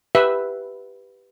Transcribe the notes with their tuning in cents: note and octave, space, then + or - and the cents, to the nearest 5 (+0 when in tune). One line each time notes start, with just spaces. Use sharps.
G4 +0 B4 +0 E5 +0